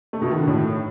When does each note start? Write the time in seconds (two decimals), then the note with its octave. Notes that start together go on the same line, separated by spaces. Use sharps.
0.13 A3
0.22 B2
0.30 D#3
0.39 D3
0.47 A2